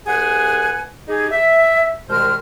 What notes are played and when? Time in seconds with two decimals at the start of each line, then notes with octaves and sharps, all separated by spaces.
0.06 C2 G#4 B4 F#5 G#5
1.08 D#4 G4 G#4
1.31 E5
2.09 C2 B2 D#3 G#3 C5 F6